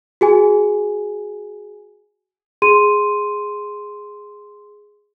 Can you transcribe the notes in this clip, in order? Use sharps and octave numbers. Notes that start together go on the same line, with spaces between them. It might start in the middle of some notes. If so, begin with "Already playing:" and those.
F#4 G#4 G#5
G#4 C6 D#7